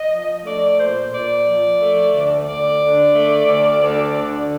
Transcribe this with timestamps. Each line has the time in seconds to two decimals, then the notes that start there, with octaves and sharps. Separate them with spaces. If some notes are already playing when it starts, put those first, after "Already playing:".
Already playing: D#5
0.10 F3
0.43 A3 D5
0.78 A#2 C5
1.11 A#2 D5
1.45 F3
1.79 A3
2.13 D2
2.46 D2 D5
2.81 D3
3.14 A3
3.47 D2
3.82 D2
4.16 D3